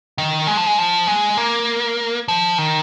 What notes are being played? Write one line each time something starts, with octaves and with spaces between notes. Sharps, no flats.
D#3
G#3
F3
G#3
F3
G#3
A#3
F3
D#3